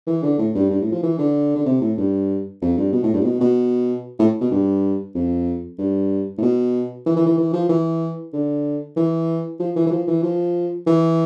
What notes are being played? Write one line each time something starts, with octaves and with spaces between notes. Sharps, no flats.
E3
D3
A2
G2
G2
A2
F3
E3
D3
D3
C3
A2
G2
F2
G2
B2
A2
G2
A2
B2
B2
A2
B2
G2
F2
G2
A2
B2
E3
E3
E3
E3
F3
E3
D3
E3
F3
E3
E3
F3
E3
F3
E3